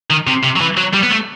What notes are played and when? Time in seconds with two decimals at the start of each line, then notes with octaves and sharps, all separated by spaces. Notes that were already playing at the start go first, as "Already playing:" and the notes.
0.10 D#3
0.27 C3
0.44 C3
0.56 F#3
0.61 E3
0.77 F#3
0.94 G3
1.03 B3
1.11 A3